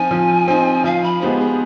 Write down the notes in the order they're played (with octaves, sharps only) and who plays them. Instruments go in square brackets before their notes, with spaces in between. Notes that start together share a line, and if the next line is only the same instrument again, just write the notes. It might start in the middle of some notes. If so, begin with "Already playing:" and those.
Already playing: [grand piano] F3 C4 D#4 [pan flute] G#5
[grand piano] F3
C4 D#4
[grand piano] F3 [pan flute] F5
[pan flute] B5
[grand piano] G#3 B3 D#4 G4 [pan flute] C5
[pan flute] G#4